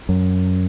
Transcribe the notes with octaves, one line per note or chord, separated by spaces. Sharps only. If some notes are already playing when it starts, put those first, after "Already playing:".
F#2